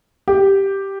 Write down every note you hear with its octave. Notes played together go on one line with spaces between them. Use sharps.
G4